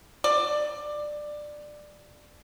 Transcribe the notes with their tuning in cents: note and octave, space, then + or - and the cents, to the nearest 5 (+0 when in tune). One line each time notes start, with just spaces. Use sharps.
D5 +15